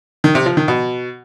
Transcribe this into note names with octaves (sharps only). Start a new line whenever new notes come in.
D#3
C3
F3
D#3
B2